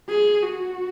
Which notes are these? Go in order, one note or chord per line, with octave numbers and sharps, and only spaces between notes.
G#4
F#4